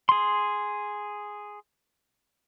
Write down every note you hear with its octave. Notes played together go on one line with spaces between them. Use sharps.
G#4 C6